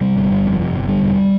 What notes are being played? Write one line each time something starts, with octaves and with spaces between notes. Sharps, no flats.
C3 G3
G1
G1
F2
C3
G1
D3 G3
E1